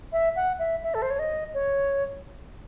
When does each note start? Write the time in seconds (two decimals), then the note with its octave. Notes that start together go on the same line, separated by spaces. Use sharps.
0.13 E5
0.36 F#5
0.59 E5
0.83 E5
0.94 A4
1.02 C5
1.10 C#5
1.19 D#5
1.54 C#5